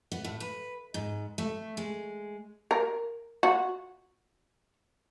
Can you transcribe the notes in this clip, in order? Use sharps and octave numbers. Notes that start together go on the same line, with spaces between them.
B3
A2
B4
G#2
A3
G#3
A#4
F#4